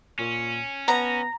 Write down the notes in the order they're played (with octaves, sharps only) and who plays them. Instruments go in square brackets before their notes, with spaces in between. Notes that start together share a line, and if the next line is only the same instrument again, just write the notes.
[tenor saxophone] A#2 [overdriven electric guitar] C#4
[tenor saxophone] B3 [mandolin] A#5